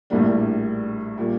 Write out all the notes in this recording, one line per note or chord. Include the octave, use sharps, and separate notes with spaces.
A#1 A2 G3 A#3 D4
A#2 G3 A#3